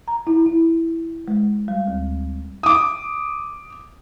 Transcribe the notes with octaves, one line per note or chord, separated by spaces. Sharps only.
A#5
E4
E4
G#3
G3
D2
D6 D#6